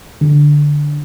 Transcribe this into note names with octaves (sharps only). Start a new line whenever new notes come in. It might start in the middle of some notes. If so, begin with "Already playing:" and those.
D3